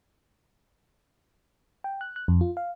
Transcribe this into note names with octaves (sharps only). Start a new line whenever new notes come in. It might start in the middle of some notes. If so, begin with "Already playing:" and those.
G5
F#6
F#6
F2
F4
F5